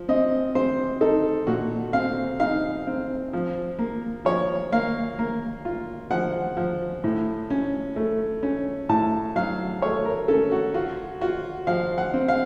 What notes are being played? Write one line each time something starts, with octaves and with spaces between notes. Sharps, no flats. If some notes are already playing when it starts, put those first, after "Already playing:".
Already playing: F3
C4 D#5
C4 C5
D#4 A4
A#2 F#4
C4 F5
D#4 F5
C4
F3
A#3
F3 C#5
A#3 F5
A#3
F4
F3 F#5
F3
A2
C#4
A3
C#4
A2 A5
F#3 F5
A3 C#5
A#4
C#4 A4
F#4
F4 F#4
F4 F#4
F3 F5
F#5
C4
F5